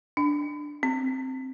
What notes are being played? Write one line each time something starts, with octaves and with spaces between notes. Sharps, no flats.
D4
C4